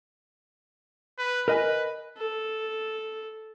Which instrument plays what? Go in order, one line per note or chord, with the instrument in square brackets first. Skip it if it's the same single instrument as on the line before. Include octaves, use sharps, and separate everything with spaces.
[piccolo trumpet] B4
[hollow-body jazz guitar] A#4 D#5 G#5 [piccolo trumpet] B4
[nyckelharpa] A4